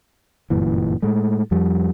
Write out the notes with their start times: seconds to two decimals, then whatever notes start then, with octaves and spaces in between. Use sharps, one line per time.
0.50 G1 F#2 A#2 E3
1.02 A2 G#3 A3
1.51 F2 F3 G3